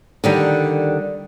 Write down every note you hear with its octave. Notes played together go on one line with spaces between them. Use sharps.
D3 D#3 G3